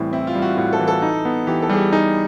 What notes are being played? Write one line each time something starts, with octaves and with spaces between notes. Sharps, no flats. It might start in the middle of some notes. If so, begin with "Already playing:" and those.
Already playing: A2 E3 G3 C4
C4 E4
F4
G3
F#4
A2 F#4
A4
E3
A4
D#4
B3
E3 G4
A4
G3 G#4
G4
D#4 G#4